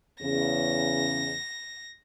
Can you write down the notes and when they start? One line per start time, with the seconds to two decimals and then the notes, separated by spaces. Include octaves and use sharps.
0.22 E2 C#3 A#6